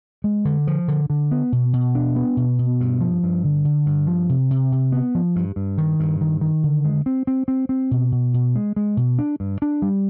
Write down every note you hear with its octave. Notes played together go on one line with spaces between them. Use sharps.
G#3
D3
F3
D3
D3
B3
B2
B2
D4
B3
B2
B2
G2
F3
G2
D3
D3
G2
F3
C3
C3
C3
B3
F3
G2
G2
D#3
G2
D#3
D#3
D3
G#3
C4
C4
C4
C4
B2
B2
B2
G#3
G#3
B2
D4
G2
D4
G3